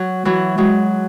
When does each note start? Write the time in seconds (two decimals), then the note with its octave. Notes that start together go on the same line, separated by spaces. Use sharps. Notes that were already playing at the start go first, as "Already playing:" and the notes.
Already playing: F#3
0.25 E3 F#3
0.58 F#3 G#3